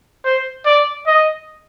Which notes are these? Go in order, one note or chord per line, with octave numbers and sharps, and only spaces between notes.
C5
D5
D#5